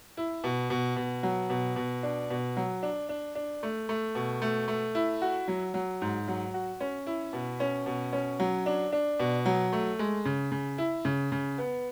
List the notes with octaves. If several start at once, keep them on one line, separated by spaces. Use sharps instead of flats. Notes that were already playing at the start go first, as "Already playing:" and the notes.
E4
B2
B2
B2
F#3
B2
B2
D4
B2
F#3
D4
D4
D4
A3
A3
B2
A3
A3
E4
F#4
F#3
F#3
G#2
F#3
F#4
C#4
E4
B2
C#4
B2
C#4
F#3
D4
D4
B2
F#3
A3
G#3
C#3
C#3
E4
C#3
C#3
B3